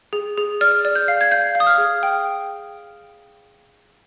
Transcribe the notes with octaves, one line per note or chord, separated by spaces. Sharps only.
G#4
G#4
D5 F6
D5
G6
F5
G#6
F5 G6
F5
D#6
F6
G#4
G5